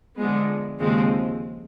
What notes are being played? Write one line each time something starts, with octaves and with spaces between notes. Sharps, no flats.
D3 F3 G#3 B3
D#2 C#3 F3 G#3 C4